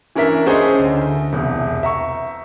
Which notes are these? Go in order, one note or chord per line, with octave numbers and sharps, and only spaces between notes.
E3 C#4 D4 A#4 E5 B6
C#4 D4 G#4 C5 D#5
D2
E1 C2
E5 A#5 C#6